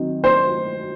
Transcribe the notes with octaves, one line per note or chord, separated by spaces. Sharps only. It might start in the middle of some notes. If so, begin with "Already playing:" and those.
Already playing: D#3 F#3 C4 D#4
C5